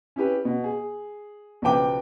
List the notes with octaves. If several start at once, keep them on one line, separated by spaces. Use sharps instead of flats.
C#4 E4 G4 B4
B2
G#4
B1 C#3 F3 B4 G5 D6